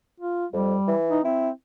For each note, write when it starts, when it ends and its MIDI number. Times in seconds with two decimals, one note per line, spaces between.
0.21 0.46 65
0.53 0.74 41
0.53 0.94 55
0.88 1.19 52
1.11 1.23 63
1.25 1.51 60
1.25 1.49 64